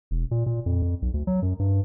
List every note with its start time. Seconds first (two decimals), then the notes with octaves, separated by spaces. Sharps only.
0.11 E1
0.31 A#2
0.46 A#2
0.66 F2
0.82 F2
1.02 B1
1.14 D2
1.27 F#3
1.42 F#2
1.59 G2